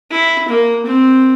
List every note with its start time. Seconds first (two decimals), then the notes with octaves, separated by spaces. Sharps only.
0.11 E4
0.48 A#3
0.85 C4